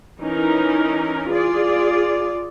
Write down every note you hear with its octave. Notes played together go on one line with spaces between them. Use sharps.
E3 C#4 D#4 A#4
F4 G#4 D5